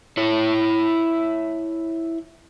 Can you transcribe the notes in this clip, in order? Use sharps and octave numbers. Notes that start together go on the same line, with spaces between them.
E4 C#5